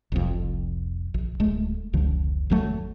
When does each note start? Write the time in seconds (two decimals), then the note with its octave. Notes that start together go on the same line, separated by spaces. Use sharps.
0.12 F1 C2 F2
1.14 A#1
1.40 D1 G#3 A3
1.93 F1 C#2 D3 F3
2.50 G#1 E2 F#3 A3